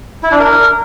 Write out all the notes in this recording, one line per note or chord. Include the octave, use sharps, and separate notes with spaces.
E4
D4
A#4